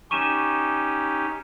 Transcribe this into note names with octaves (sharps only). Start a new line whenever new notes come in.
C#4 D#4 G4 C#6 D#7 E7